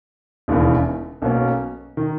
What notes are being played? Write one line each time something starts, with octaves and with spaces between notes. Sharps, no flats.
E1 D#2 C#3 E3 B3
B1 B2 A#3 C#4
D#3